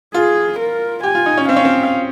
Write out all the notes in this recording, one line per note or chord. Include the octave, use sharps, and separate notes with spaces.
F4 G#4
A#4
G4 G#5
F4
D#4
C#4
C4 F5
C#4
C4